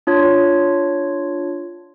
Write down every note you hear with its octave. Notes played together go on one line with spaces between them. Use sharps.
D4 F4 C#5 G#6